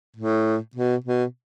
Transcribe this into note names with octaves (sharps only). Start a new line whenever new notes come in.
A2
B2
B2